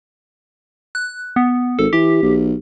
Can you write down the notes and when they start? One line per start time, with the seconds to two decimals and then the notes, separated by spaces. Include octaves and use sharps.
0.95 F#6
1.36 B3
1.79 G#1 A4
1.93 E3 G4
2.22 B1